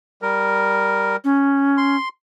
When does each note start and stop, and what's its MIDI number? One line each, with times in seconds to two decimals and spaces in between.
0.22 1.16 55
0.22 1.16 70
1.24 1.96 61
1.77 2.09 84